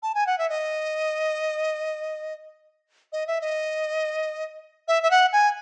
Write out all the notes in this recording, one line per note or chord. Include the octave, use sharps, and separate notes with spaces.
A5
G#5
F#5
E5
D#5
D#5
E5
D#5
E5
E5
F#5
G#5